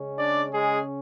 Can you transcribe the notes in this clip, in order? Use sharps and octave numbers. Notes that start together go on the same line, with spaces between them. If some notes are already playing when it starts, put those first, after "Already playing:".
Already playing: C#3 G#3 C#4
D4 D5
G#3 G#4